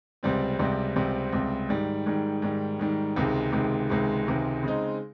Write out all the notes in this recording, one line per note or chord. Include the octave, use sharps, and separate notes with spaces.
C#2 C3 G3 C4
C#2 C3 G3 C4
C#2 C3 G3 C4
C#2 C3 G3 C4
G#2 D#3 G3
G#2 D#3 G3
G#2 D#3 G3
G#2 D#3 G3
C#2 C3 D#3 G#3
C#2 C3 D#3 G#3
C#2 C3 D#3 G#3
C#2 C3 D#3 G#3
C#3 G#3 C4 D#4